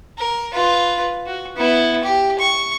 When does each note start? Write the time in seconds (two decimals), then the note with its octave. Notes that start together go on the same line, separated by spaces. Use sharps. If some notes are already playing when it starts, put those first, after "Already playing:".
0.18 A#4
0.52 F4 B4
1.26 F#4
1.56 B3 E4
2.03 G4
2.39 C#6